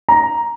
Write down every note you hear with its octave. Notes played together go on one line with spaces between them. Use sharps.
A#5